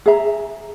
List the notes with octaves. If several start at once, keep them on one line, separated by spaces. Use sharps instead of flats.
G#4 E5 A#5